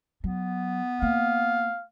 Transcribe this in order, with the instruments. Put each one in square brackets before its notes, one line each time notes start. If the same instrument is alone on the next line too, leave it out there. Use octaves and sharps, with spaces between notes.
[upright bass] F#3 [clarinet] B3
[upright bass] A#3 [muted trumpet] F5